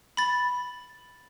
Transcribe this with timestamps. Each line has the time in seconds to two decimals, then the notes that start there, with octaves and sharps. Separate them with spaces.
0.17 B5 A6